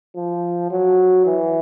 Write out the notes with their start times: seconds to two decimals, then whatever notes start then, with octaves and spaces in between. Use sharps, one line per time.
0.16 F3
0.71 F#3
1.26 E3